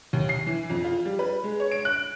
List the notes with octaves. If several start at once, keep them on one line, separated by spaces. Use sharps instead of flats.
D#2
C7
E3
F2
F4
G3
B4
G#3
C#5
D7
F#6